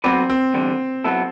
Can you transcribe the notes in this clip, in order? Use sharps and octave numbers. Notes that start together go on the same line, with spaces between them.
F#3 B3 C4 F#4 B4 D5
C4
E2 D3 G3
F#3 B3 E4 A4